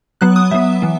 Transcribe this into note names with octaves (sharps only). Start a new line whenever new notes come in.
F#3 B3 F#6
D#6
F#3 B3 E5
E3 B3